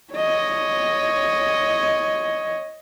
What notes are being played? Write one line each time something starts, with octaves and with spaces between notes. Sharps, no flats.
C#5 D#5